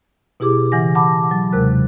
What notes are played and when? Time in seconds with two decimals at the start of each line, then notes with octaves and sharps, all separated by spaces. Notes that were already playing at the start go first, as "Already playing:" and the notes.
0.40 B2 E4 G4 G#4 D6
0.72 C#3 E3 F#5 G#5 A#6
0.95 F#5 A5 B5 D6
1.31 F#3
1.52 D#2 C3 G#3 A#4 F#6